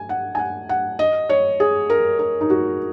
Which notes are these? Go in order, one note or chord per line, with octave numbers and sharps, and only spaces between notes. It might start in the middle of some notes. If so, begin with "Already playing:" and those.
Already playing: G#5
F#5
G#5
F#5
F#5
D#5
C#5
G#4
A#4
A#4
D#4
F#4